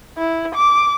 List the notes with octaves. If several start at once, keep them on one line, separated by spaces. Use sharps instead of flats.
E4
D6